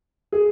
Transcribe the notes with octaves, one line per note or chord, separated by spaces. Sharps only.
G#4